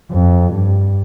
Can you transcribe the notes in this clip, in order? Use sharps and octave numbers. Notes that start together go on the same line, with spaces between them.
F2
G2